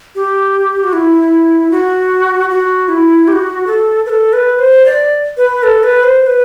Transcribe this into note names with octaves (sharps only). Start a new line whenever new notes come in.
G4
F#4
E4
F#4
F#4
E4
G4
F#4
A4
B4
A4
B4
C5
D5
B4
A4
B4
C5
C5
B4